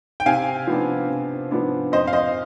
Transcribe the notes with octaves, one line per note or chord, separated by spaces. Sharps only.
G5
C3 F5 G#5
F3 B3 D4
C3
F3 B3 D4
F2 C5 D#5
F5
C5 D#5